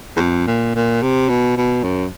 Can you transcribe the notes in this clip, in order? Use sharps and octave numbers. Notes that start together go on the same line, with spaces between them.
E2
F2
A#2
A#2
C3
B2
B2
F#2